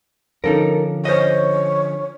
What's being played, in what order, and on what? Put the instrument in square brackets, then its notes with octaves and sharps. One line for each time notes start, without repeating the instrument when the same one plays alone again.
[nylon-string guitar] D3 F3 C#4 [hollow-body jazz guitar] D#4 A4 A#4
[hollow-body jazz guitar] C5 D#5 [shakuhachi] C#5